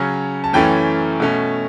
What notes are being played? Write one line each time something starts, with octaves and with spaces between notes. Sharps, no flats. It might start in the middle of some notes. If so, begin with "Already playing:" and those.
Already playing: C#3 F#3 C#4
A5
F#2 E3 A3 C#4 G5
B2 A3 C#4